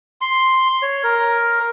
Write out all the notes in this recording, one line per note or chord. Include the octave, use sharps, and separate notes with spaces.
C6
C#5
A#4